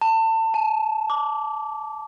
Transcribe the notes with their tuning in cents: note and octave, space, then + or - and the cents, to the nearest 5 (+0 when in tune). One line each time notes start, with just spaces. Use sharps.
A5 +30
A5 -35
D6 -15